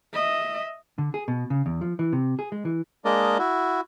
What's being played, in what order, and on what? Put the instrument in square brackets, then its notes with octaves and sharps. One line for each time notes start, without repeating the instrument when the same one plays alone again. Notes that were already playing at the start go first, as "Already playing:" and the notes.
[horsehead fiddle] D#5 E5
[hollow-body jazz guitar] D3
G#4
B2
C#3
E2
F3
E3
C3
G#4
G#3
E3
[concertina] G#3 A#3 D4 A#4 D5 D#5
E4 F#4